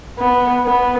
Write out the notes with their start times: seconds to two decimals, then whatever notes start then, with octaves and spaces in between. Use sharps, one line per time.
0.19 B3
0.65 B3